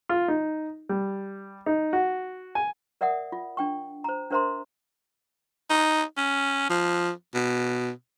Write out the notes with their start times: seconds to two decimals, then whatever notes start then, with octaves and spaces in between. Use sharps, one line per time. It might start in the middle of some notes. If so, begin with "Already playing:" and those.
0.09 F4
0.28 D#4
0.89 G3
1.66 D#4
1.93 F#4
2.55 G#5
3.01 A#4 D5 E5 F#5 D#6
3.32 F4
3.57 D4 G5 C#6
4.04 C5 A#5
4.31 D4 A#4 C5 E5 A#5 C6
5.70 D#4
6.17 C#4
6.69 F3
7.34 B2